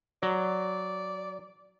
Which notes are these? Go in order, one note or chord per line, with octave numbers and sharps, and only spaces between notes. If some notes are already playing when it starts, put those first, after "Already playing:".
F#3 D5